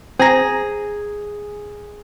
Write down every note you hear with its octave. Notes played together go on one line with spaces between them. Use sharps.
C4 G#4 A#5